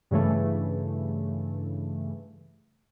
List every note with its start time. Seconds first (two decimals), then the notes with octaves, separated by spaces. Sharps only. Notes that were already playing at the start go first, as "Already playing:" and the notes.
0.11 G2 C#3 E3 A3